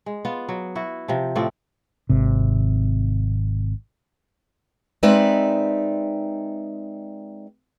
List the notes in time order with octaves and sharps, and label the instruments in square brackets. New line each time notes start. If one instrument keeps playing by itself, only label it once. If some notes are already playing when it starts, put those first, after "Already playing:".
[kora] G#3
B3 F4
F#3
E4 F#4
C3 F3
A2 F3 C4 D5
[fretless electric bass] G#1 C3
[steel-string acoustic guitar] G#3 C4 D#4 B4 D5 E5